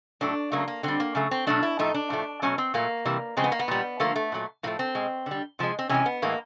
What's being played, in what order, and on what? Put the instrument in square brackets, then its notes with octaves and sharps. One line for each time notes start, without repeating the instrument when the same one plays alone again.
[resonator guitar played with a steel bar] A2 F#3 A3 D4
C#3 F#3 A3 A#3
A#3
D3 G3 C4
A#3
C#3 F#3 A3
C4
B2 F#3 A3 D4
E4
A2 F3 A3 D#4
D4
A2 F3 A3
B2 F#3 A3 C#4
C4
A#2 F#3 A3 A#3
C3 E3 G3
C#3 F3 G#3 C4
B3
A#3
B3
A#2 G3
D3 F3 A3 A#3
A3
A#2 F#3 A3
A2 F3 A3 A#3
C4
B2 G#3
D3 G3
C3 F3 G#3
C4
C3 E3 G#3 C#4
B3
A2 E3 G#3 A#3